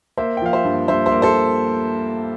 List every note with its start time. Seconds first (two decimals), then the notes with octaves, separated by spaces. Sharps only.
0.18 A#3 C5 E5
0.37 G5
0.42 F3 F5
0.53 C5 E5
0.65 G2
0.88 G2 C5 E5
1.06 C5 E5
1.11 A#3
1.22 A4 C5